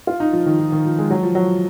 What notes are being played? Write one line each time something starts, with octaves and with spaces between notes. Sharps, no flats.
F4
D#4
F3
D#3
F3
D#3
F3
G#3
F#3
F3
F#3